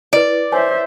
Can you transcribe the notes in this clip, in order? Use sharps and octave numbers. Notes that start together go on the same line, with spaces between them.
E4 B4 D5
C5 C#5 E5 G#5